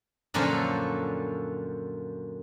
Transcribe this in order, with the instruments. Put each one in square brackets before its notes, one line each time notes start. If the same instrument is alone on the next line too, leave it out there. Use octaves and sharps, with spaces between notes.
[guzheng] F#2 A#2 D3 F3 C#4 A4